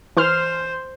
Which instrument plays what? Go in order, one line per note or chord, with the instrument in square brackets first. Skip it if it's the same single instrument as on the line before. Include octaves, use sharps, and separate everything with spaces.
[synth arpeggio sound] E3 C6 F6 [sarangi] C5